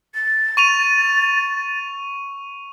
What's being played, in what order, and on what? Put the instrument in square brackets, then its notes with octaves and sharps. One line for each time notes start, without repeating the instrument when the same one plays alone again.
[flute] A6
[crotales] C#6 D#7 F7